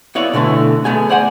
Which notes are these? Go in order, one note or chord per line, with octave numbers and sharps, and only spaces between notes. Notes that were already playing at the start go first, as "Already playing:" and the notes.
B3 E4 C#5 D5 F5
B2 D3 E3 G#3 A3
A3 B3 G#4 G#5
C5 D5 F#5 G#5